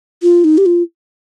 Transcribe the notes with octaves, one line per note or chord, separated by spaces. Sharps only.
F4
D#4
G4
F4